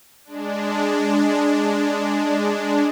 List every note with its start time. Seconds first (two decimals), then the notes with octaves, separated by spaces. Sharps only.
0.25 G#3 D4